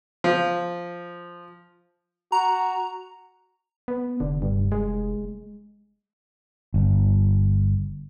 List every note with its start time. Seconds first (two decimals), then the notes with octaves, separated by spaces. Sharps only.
0.24 F3
2.32 F#4 A#5
3.88 B3
4.20 F1 D3
4.42 G2
4.72 G#3
6.74 G1